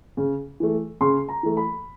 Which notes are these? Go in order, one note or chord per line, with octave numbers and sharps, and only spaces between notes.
C#3
E3 A3
C#3 C6
A#5
E3 A3
B5